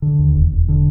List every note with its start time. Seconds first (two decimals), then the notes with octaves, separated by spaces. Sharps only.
0.02 D3
0.19 D#2
0.35 E1
0.52 E1
0.68 D3